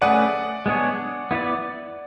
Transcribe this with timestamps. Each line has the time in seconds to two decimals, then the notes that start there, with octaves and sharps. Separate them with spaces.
0.01 A3 C#4 G#4 B4 D5 F#5
0.66 G#3 B3 D4 G#4 C#5
1.31 B3 E4 B4 D5